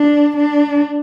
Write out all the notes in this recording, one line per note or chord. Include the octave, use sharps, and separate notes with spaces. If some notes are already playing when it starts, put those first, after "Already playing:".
Already playing: D4
D4